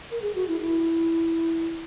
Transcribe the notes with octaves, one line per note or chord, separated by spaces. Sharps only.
A#4
G#4
F#4
E4
E4